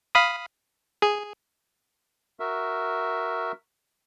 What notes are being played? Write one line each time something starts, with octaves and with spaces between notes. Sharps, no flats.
F5 B5 D#6
G#4
F#4 A#4 E5